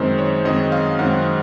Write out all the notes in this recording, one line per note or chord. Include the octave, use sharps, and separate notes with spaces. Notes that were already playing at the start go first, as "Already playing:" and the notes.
Already playing: F#2 D#3 G#3 C4 C5
C#5
F#2 D#3 G#3 C4 D#5
F5
F#2 D#3 G#3 C4 F#5